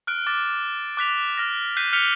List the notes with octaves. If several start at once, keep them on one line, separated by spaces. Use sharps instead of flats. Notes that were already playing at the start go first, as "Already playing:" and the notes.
F6 F#6 D7
D6 A6
D6 F#6 B6 F7
F6 A#6
F#6 G6 B6 C7 D#7
F6 G6 B6 C#7 F7 G7